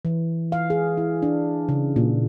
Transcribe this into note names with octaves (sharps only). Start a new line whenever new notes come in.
E3
F5
G#4
E4
D4
C#3
A#2